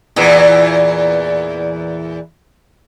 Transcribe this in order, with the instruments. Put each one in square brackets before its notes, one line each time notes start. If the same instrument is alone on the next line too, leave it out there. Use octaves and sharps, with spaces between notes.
[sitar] E2 A#2 E3